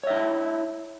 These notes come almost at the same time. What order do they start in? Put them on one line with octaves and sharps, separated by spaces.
C#5 E5 D#4 E4